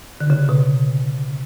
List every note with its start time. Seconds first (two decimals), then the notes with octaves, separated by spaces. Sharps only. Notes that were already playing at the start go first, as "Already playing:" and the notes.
0.21 D3
0.30 C#3
0.39 D3
0.49 B2